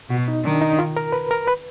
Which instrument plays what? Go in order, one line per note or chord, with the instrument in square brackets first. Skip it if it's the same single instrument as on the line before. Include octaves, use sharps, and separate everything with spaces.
[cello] B2 [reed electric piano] F#4
[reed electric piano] D#4
[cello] D#3 [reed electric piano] D4
[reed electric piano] D#4
F4
A#4
B4
A#4
B4